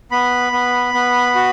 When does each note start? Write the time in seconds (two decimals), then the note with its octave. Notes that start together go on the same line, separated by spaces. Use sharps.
0.11 B3 B5
0.53 B3
0.94 B3
1.35 F#4